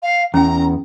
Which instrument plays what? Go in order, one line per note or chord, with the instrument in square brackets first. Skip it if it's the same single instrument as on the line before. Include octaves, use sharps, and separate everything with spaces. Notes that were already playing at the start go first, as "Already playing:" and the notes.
[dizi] F5
[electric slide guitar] E2 [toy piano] C#4 G5 [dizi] A#5